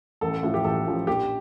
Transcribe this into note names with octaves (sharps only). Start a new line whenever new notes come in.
A1 A4
A2 F3
G4
A1 A4
A2 F3
A#1 G4